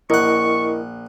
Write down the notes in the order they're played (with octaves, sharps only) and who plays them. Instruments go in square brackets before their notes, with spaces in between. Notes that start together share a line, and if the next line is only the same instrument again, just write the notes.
[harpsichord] A#1 F#5 [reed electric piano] E4 A#4 D#5 [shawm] C#6